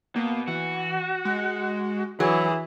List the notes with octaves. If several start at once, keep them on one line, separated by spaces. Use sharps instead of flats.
B2 A#3
E3 F#4
G#3
E3 F#3 G#4